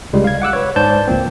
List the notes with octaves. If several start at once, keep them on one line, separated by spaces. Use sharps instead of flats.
C#2 G3 G#3
F5 G#6
F#5 D6 E6 F#6
B4 C#5
G#2 C5 D5 A5 G6
C#2 F3 A#3 C4